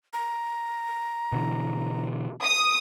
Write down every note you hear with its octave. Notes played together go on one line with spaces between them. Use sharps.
A#5
B2 D3 E3
D#6